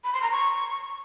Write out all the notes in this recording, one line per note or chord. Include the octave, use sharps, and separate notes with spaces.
B5
C6
A#5
C#6